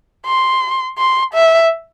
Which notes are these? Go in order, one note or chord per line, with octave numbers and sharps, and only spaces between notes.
C6
C6
E5